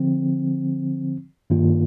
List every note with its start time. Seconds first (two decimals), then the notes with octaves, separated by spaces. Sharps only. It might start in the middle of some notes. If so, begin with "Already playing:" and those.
Already playing: D3 F3 C4
1.50 G2 D#3 A#3 F4